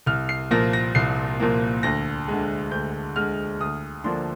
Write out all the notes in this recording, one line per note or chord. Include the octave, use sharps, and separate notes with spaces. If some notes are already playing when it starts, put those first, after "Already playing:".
C2 F6
C7
A#2 F3 A#3 A#6
A#6
C2 C7
A#2 F3 A#3
D2 A#6
D3 G#3
D2 G6
D3 G#3 F6
D2 D#6
D3 F3 A#3 D4 C6